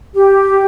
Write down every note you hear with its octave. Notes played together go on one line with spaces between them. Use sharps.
G4